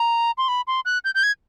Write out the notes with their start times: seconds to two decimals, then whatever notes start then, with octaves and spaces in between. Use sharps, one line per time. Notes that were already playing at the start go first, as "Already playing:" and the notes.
Already playing: A#5
0.38 C6
0.48 B5
0.67 C6
0.85 F#6
1.04 G6
1.15 G6
1.23 G#6